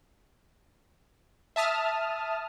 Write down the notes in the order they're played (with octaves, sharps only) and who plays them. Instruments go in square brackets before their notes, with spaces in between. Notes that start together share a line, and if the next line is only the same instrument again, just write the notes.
[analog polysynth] E5 A5 D#6 F6